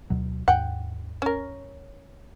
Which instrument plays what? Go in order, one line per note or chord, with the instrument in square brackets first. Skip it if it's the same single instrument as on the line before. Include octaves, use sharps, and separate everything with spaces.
[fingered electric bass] D2 B2 F#3
[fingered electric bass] D#2 G#2 [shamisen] F#5 G5
[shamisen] C#4 A#4